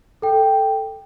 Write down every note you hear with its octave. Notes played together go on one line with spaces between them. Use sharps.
A4 G5